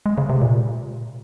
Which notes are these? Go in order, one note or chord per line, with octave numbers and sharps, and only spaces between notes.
G#3
C#3
C3
A#2